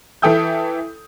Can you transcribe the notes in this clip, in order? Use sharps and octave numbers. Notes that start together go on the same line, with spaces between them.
E3 E4 A4 G5 D#6 G6